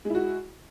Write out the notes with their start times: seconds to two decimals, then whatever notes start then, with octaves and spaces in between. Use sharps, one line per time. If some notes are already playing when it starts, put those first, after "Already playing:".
0.05 G#3
0.10 E4
0.15 F#4